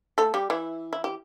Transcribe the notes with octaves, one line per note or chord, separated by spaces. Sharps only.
A3 A4
G3 G4
E3 E4
E4
G4